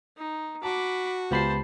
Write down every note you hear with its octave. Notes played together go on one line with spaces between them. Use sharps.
D#4
F#4 A5 B5 D6
C#2 B3 F4 G4 C5 A5 B5 C7